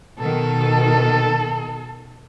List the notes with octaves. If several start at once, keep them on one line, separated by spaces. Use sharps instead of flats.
B2 D#3 A4